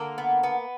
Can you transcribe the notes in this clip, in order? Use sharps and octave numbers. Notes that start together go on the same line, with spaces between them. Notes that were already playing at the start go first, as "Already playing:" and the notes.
Already playing: D3 A#3 A#4
B3
B3